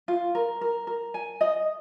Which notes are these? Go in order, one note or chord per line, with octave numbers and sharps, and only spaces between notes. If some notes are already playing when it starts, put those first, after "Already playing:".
F4
A#4
A#4
A#4
G#5
D#5